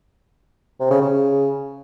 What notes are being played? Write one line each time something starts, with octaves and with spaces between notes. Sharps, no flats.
C3
C#3
C#3